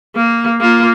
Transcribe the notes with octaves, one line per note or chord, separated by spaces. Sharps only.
A#3
A#3 F4